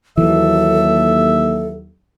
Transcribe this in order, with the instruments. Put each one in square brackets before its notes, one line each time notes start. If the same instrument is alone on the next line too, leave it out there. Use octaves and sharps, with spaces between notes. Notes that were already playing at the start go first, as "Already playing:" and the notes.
[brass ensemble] D#2 F#3 [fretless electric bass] E3 [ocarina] A4 [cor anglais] E5